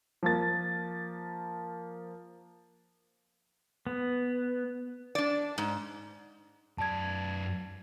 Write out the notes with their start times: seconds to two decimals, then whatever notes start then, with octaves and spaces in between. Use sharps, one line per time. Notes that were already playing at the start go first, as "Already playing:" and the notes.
0.23 F3 A#3 A6
3.87 B3
5.15 D4 D5
5.58 G#2
6.78 F#2 D5 A5 G#6